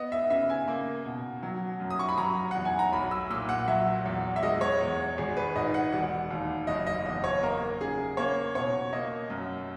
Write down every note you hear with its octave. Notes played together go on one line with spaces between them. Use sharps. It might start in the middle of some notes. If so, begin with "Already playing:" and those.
Already playing: B3 D#5
E5
C#3 E5
G#5
A#3
B2
F#3
F#2
D#6
C#6
B5
F#3 A#5
E2 F#5
G#5
A#5
B1 B5
E6
A#2 E6
F#5
F#3 E5
E2
E5
G#3 D#5
C#5
E2
G#1 G#4
B4
G#2 D#5
F#5
E1 F#5
D#2
F#1 D#5
D#5
E2 D#5
C#5
A#3 A#4
C#3 G#4
A#3 C#5
B2 C#5
A#3 D#5
F#2